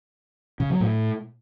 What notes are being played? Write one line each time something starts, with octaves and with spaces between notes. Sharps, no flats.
C#3
F#3
A2